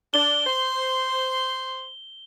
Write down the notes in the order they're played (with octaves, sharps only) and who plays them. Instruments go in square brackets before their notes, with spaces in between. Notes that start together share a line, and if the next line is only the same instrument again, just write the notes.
[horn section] D4 [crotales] G7
[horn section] C5 C6